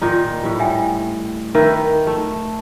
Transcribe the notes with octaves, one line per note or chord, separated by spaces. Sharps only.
A#2 D#3 D#4
A2 G3
E5 G5 G#5
D#3 A#4 B4 E5
A3